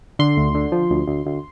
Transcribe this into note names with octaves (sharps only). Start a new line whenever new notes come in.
D3 C6
D2
D3
F3
D2
D2
D2